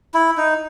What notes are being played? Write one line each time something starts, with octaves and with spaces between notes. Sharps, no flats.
E4
D#4